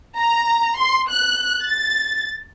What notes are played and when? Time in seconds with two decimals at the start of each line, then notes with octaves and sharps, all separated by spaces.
0.17 A#5
0.78 C6
1.11 F#6
1.65 A6